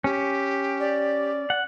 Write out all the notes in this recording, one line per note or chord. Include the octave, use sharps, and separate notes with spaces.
C#4 G4
D5
F#5